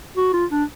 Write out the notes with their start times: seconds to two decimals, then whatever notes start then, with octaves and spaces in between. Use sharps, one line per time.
0.17 F#4
0.34 F4
0.52 D4